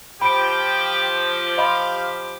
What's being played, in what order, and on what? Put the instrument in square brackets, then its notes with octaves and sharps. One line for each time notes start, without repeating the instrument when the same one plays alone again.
[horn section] F3 G4 [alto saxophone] G5 [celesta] B5 D7
[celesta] D#5 B5 C6 [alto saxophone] F5